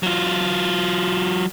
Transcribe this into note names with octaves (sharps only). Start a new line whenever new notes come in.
F#3 F4